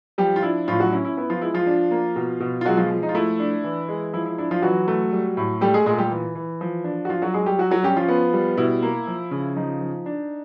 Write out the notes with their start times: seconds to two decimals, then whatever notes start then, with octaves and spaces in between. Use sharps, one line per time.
0.18 F3 G3 G4
0.36 F4
0.43 D4 E4
0.68 A2 F3 F4
0.80 F#3 F#4
0.92 C#4 E4
1.05 E4
1.17 B3 E4
1.30 F3 F4
1.42 G#3 E4
1.54 F3 F4
1.67 D4
1.91 A#3
2.16 B2
2.40 B2
2.61 F4
2.65 F#3 G#3 F#4
2.77 F3 F4
2.91 F3
3.03 D#4
3.09 F4
3.15 A3 E4
3.40 D4
3.64 E3
3.88 G#3
4.13 F3 E4
4.26 E4
4.38 D4 E4
4.51 F3 F4
4.62 E3 F#3 F#4
4.88 A3
5.13 G3
5.37 A2
5.61 G3 A3 G4
5.74 G#3 G#4
5.86 A#2 G#3 G#4
5.98 G3 G4
6.11 E3
6.35 E3
6.61 F3
6.84 D4
7.05 F#4
7.09 F3 D4 F4
7.22 F#3 F#4
7.34 F#3 G#3 G#4
7.46 G3 G4
7.59 F#3 F#4
7.71 F#3 F#4
7.83 G3 C#4 G4
7.96 F3 F4
8.09 B3
8.34 G3
8.57 B2 E4
8.82 A#3
9.07 F3
9.31 C#3
9.56 F3 D#4
9.81 F3
10.06 D4